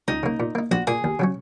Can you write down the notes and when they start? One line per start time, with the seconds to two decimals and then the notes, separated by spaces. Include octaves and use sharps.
0.08 C#2 D#4
0.23 C#3 A#3
0.40 A#2
0.55 A#3 D#4
0.71 A#1 F#4
0.87 A#2 A#3 G#4
1.04 D#2
1.19 C#3 F#3 C#4